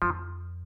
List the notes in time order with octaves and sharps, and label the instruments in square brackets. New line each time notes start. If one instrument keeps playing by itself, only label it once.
[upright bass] F2 [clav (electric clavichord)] F3